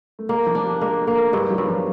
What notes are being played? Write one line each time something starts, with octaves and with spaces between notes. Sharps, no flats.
A3
G#3 A#3
F3
D4
G3
G#3 A#3
A3 A#3
G2 G#3
F#3
G2
F3